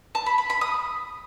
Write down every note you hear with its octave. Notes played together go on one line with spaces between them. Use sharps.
A5
B5
B5
B5
D#6